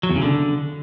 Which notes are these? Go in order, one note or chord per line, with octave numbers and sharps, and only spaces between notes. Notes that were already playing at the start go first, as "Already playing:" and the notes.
F#3
E2
C#3
D3